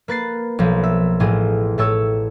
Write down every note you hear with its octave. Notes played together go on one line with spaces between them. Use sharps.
A#3 B4 A6 C7
B1 F3 A#3
E5
A1 A2 F4 G#4 D#6
A2 A3 A4 C#5 E6